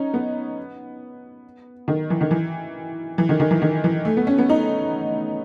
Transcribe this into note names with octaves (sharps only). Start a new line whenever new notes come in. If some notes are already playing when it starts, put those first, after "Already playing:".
Already playing: C#4 D#4
B3
D#3
E3
D#3
E3
E3
D#3
D#3
E3
D#3
E3
A3
B3
C#4
B3
D#4